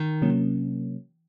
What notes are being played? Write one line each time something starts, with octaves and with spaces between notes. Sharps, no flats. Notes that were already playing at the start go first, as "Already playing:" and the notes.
Already playing: D#3
C3 F#3 A#3 C#4